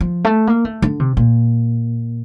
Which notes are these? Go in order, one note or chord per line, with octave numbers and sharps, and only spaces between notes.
F3
A3
A#3
A3
D3
C3
A#2